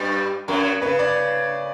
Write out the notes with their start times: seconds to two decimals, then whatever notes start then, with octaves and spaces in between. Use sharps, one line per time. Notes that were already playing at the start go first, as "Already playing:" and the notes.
Already playing: G2 G3 B4
0.48 F#2 F#3 A#4
0.82 C#3 B4
0.99 D5